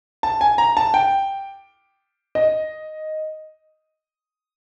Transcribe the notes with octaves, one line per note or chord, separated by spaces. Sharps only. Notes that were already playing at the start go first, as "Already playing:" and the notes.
A5
G#5
A#5
A5
G5
D#5